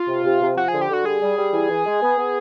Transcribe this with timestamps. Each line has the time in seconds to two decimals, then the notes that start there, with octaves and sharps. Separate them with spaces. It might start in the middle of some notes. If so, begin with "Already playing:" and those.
Already playing: F4
0.08 C3
0.25 C3
0.41 C3
0.57 F3 F#4
0.68 D3 G#4
0.81 G4
0.89 D3 F#4
1.05 G3 G#4
1.22 G3
1.37 G3
1.53 E3
1.69 E3
1.86 G#3
2.02 B3
2.18 B3